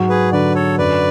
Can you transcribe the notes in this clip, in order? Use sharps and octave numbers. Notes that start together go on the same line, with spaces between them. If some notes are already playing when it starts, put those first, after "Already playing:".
Already playing: G#2 F#3
G#4 B4
D3 B4 D5
A4 C#5
F#2 B4 D5